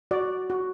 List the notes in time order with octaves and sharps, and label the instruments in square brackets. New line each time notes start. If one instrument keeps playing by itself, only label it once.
[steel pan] F#4 D5
F#4